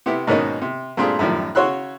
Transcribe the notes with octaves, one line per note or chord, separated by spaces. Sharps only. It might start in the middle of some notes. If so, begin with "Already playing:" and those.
C3 B3 E4 G4
G#2 B2 D#3 A#3 C#4 D#4
C3
G2 A#2 A3 C4 F4 G#4
F#2 A2 D#3 F3 G3
C#3 F#4 C#5 C6 E6 F#6